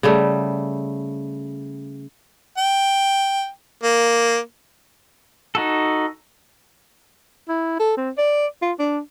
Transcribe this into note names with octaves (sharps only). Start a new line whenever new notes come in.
C#3 G3 A3
G5
A#3
D#4 F#4 A4
E4
A4
C4
D5
F4
D4